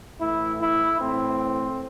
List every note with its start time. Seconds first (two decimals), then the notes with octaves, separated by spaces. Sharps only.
0.20 A2 E3 E4
0.60 E4
1.01 A2 E3 C4